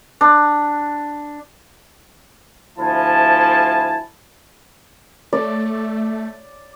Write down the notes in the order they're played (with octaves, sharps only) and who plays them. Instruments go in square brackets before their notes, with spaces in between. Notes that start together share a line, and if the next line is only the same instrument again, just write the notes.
[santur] D4
[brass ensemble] D2 F3 E4 G#5 A5
[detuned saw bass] A3 [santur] D5